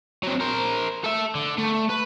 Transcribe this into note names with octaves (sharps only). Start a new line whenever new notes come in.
F#3 C4
A#4 C5
A4 E5
D3
A3
B4